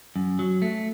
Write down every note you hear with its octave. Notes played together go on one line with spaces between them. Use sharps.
F#2
F#3
A3